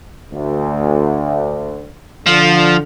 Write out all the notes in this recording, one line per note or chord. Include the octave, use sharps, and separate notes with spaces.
D2
D3 F3